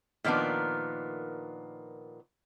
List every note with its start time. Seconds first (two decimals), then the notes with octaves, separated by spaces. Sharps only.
0.24 A#2 D#3 F3 B3 D4